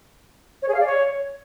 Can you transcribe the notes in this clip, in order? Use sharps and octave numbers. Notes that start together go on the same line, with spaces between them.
C#5
G#4
F5
D5
C#5